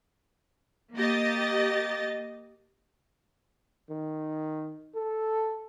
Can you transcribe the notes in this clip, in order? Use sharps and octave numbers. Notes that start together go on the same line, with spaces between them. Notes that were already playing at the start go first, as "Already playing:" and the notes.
A#3 G4 D#5 A6
D#3
A4